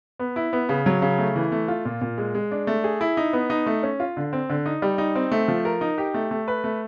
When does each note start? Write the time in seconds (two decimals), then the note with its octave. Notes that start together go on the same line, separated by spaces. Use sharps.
0.19 B3
0.36 E4
0.53 B3
0.69 C#3
0.86 F#3
1.02 C#3
1.18 A3
1.36 E3
1.52 A3
1.68 F4
1.85 A#2
2.01 A#2
2.18 G#3
2.35 G#3
2.51 D4
2.67 A3
2.84 G#4
3.01 E4
3.17 D#4
3.33 B3
3.50 D#4
3.66 A3
3.83 C#4
4.00 F4
4.17 D3
4.33 C4
4.50 D3
4.66 D#4
4.82 G3
4.98 D#4
5.15 C4
5.32 A3
5.48 F3
5.65 A#4
5.81 D#4
5.98 G4
6.14 A3
6.31 A3
6.48 B4
6.64 A3